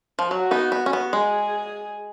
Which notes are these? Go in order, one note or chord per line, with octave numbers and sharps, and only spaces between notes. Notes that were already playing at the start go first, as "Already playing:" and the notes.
F3
F#3 F#4
B3 D#4
B3
C#4
B3
G#3 G#4